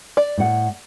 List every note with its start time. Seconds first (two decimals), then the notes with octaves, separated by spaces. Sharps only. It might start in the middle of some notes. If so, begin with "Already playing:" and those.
0.17 D5
0.38 A2 F#5